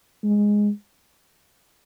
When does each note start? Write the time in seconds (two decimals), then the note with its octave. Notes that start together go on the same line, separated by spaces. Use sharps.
0.23 G#3